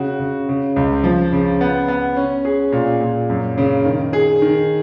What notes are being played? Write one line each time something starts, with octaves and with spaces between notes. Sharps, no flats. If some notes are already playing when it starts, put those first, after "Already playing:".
Already playing: C#3 F#4
C#3
C#3
C#2
F3
C#3
B3
B3
C#4
G#4
A#2
A#2
F#2
C#3
D#3
G#4
D#3